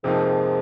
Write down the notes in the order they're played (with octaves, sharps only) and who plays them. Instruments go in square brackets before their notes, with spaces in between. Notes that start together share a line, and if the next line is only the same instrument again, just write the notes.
[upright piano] F2 C3 F3 A#3 D#4 [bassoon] G#2